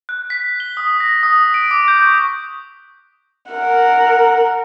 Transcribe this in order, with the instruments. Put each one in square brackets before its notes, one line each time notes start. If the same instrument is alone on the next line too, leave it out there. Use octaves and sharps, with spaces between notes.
[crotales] F#6
B6
G7
D#6
A#6
D#6
D7
D6
G6
C#6
[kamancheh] A#4 F#5